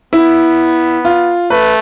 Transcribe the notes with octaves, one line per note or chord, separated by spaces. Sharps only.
B3 E4
F4
A3 B4